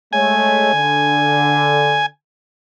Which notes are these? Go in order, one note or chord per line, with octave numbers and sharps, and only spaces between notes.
G#3 A3 C#5 G#5
D3